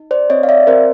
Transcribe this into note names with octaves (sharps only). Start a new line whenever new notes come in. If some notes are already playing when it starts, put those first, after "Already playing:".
Already playing: D#4
C5 D5
C4 C#5 D#5
F5
D5 E5
C4 A#4 C5